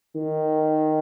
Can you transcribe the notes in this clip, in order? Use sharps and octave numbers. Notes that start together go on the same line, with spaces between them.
D#3